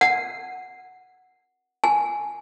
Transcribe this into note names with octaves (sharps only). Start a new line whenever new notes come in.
F#5
G#5